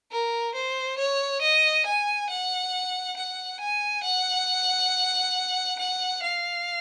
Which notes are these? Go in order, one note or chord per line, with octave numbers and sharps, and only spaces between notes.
A#4
C5
C#5
D#5
G#5
F#5
F#5
G#5
F#5
F#5
F5